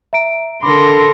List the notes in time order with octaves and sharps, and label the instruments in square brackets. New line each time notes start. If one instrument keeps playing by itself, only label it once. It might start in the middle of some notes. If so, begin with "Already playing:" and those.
[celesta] E5 A#5 D7
[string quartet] D3 A#6 [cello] A4 A#4 [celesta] B5 D6 [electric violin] C6